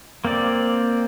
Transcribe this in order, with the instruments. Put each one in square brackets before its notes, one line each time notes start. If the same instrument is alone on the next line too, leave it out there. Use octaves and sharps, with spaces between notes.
[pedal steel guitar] A#3 C4 D5